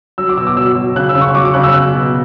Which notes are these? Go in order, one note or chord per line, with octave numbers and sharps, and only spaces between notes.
F#3 E6
D6
B2 E6
D6
F#3 E6
F#3
C#3 F#6
E6
C#3
C#6
F#3 D6
D6
C#3 F#6
E6
F#3 F#6
B2